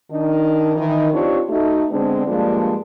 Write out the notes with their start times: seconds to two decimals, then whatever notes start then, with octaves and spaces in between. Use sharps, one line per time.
0.11 D#3 D4 D#4
0.76 D#3 E3
1.13 C4 D4 D#4 F4 G4 C#5
1.49 A3 D#4 F#4
1.90 D3 G#3 B3 C4 D4
2.27 G2 F3 G3 G#3 A#3 D4